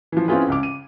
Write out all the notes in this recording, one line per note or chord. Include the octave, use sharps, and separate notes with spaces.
E3 F3
C4 C#4 E4 F4 G#4 B4
C#2 D6
D#7